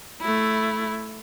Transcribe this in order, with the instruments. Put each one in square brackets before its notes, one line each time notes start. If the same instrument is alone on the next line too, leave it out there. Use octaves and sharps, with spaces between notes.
[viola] A3 E4